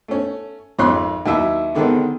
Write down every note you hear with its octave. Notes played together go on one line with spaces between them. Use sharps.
A3 C#4
G#1 F2 C#5 C6 F#6
D#2 F#3 E4 E5
B2 D3 D#3 G#3 B3 C4